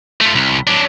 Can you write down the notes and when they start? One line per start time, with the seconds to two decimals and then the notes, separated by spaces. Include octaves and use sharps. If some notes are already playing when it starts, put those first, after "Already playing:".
0.21 A3 F4
0.35 C2
0.67 F#3 D4